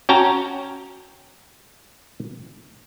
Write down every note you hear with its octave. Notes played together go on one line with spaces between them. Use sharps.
C#4 F#4 G5 A5 A#5